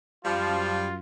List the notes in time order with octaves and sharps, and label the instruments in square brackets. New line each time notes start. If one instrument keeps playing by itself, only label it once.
[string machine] F#2 [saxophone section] F3 [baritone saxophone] G3 [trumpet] F4